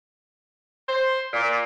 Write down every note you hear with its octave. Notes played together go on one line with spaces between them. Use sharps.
C5
A#2